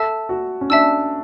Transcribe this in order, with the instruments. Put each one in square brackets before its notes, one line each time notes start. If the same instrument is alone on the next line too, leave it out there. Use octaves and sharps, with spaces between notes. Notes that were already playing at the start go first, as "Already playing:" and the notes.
Already playing: [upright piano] A4 [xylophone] E5 A5 E6
[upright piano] F#4
C#4
[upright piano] D4 [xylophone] E5 A5 E6